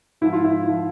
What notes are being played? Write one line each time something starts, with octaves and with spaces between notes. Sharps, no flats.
G#2 F3 E4
F4
E4
F3